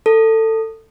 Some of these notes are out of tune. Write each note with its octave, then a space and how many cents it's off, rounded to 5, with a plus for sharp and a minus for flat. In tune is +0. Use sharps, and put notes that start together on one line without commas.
A4 +20